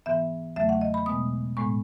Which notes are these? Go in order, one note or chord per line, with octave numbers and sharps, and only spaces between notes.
G#2 E3 B3 E5
E2 C#3 F#3 A3 E5
F#5
D#5
B5
B2 G#3 B3 D#6
A2 G#3 B3 C#6